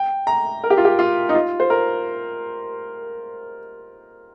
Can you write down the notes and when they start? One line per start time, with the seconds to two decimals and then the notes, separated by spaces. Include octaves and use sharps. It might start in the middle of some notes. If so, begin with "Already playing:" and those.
Already playing: G5
0.27 A#5
0.64 A#4
0.70 G4
0.77 F4
0.85 G4
0.99 F4
1.29 D#4
1.35 F4
1.60 C5
1.70 A#4